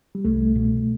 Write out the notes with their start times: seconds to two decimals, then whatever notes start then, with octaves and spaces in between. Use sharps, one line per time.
0.15 G3
0.25 C2 A3
0.55 B2